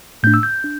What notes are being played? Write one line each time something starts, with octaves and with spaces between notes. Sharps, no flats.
A2 A3 D4 G6
E6
G6
D4